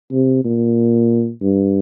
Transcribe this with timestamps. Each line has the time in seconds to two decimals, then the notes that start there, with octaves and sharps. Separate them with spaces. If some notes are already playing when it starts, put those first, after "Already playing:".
0.12 C3
0.44 A#2
1.41 G2